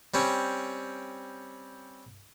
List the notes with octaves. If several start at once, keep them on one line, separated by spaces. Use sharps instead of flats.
G3 C4 C#4